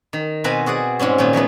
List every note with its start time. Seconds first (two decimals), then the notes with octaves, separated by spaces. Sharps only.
0.13 D#3
0.44 B2 C4 B4 G#5 A#5 B5
0.66 F#4 G#4 D5 F#5
0.99 G#2 G3 C4 C#4
1.18 A#2 D#3 C4 C#4
1.33 F3 F#3 A3 B3